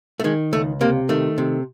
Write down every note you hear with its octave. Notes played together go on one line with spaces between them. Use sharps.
A3
D#3 G#3
C#2 A3
C3 A#3
D#3 A3
C3